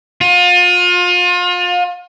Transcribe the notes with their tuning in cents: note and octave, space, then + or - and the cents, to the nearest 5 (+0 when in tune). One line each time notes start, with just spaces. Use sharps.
F4 +35